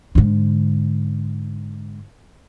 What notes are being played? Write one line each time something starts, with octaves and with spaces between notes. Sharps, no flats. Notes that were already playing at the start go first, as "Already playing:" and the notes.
G#2 D3